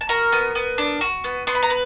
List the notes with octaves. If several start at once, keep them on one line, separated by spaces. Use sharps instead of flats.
A5
F#4 A#4 A#5
B3
B3
D4
F#4
B3
B3 C6
B5
A#5
B4